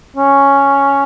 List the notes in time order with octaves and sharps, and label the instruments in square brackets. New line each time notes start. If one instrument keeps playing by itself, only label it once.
[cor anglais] C#4